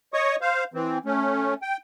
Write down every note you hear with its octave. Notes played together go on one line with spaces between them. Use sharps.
C#5 D#5 C#6 D#6
C5 F5
E3 C4
A3 C#4
G5